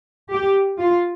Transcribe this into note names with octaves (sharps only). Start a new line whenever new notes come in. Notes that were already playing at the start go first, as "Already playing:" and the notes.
G4
F4